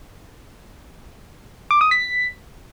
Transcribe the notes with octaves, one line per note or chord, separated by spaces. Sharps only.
D6
D#6
B6